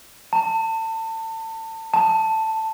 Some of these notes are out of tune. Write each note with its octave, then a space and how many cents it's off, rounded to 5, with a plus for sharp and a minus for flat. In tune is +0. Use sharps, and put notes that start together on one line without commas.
A5 +30
A5 +5